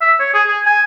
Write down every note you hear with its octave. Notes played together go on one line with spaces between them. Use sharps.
E5
C#5
G#4
G#4
G#5